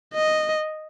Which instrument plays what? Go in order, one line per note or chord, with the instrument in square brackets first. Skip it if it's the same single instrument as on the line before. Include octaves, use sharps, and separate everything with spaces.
[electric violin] D#5